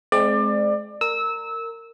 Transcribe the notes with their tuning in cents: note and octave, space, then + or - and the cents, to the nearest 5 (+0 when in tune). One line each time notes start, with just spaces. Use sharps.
G#3 +30 C4 +0 D5 +25
A#4 -20 E6 -20